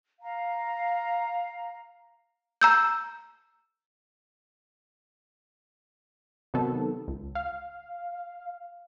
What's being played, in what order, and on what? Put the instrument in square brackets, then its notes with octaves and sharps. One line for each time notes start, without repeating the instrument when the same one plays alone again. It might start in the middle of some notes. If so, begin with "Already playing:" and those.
[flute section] F5 A#5
[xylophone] A#5 E6 G6
[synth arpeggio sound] C3 D#3 F#3 B3 A4
C#2
F5